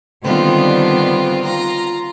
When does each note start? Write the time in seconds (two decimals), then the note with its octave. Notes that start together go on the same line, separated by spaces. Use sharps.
0.24 D3 D#3 G3 B3 C4 F4
1.44 F4 A#5